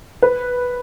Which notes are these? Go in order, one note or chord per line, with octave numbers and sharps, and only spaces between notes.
B4